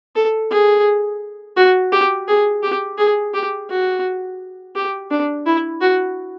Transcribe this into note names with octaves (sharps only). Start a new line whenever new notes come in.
A4
G#4
F#4
G4
G#4
G4
G#4
G4
F#4
G4
D4
E4
F#4